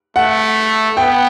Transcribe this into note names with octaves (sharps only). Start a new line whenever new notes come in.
A3 F#5
B3 G5